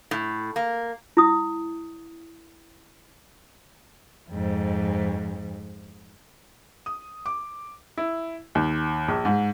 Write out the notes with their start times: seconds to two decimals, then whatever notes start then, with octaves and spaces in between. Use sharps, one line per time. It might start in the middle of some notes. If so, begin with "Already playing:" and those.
0.11 A2
0.56 A#3
1.17 E4 D#6
4.30 F2 G#2
6.86 D#6
7.26 D6
7.97 E4
8.55 D#2
9.08 A#1
9.25 G#2